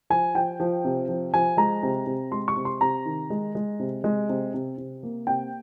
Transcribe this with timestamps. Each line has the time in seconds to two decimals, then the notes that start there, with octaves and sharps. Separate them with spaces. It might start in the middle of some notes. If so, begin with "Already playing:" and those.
0.10 F3 G#5
0.35 F3 G5
0.60 F3
0.84 C3
1.08 F3
1.33 F3 G#5
1.57 G#3 A#5
1.83 C3
2.07 C3
2.32 G#3 C6
2.48 C#6
2.57 C3
2.65 C6
2.81 C3 A#5
3.05 D#3
3.30 G#3
3.55 G#3
3.79 C3
4.04 G#3
4.29 C3
4.54 C3
4.78 C3
5.03 A#3
5.27 C3 G5